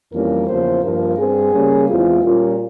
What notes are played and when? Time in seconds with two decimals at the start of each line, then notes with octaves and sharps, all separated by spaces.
0.12 F2 E3 G3 A#3 C#4 A#4
0.47 E2 C#3 F3 A#3 C#4 C5
0.83 G2 F3 A#3 A#4
1.18 G2 G3 C4 G#4
1.53 C#3 G3 A#3 C#4
1.89 E2 E3 G#3 C4 F4
2.23 A#2 G3 A#3 C#4 F4